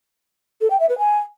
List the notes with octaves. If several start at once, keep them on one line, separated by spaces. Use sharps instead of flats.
A4
G5
E5
B4
G#5